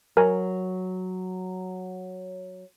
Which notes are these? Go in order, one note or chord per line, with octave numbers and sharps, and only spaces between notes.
F#3 A#4 G#5